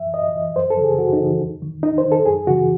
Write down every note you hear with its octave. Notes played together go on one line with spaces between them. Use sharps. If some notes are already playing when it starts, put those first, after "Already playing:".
Already playing: F#2 E3 E5
F#2 D#5
E3
F#2 C5
A4
C#3 E3
G#4
F#2 F#4
D#4
C#3 E3
E2
D#3
E2 D#4
C5
D#3
A4
F#2 G#4
C#3 E3 F#4